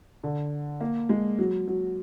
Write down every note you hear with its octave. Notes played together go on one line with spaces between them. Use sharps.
D3
A#3
G#3
F#3
F#3